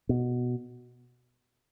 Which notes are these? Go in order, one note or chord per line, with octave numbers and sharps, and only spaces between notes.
B2